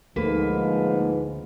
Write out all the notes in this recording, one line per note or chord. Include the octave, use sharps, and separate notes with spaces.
D2 G#2 F3 A#3 B4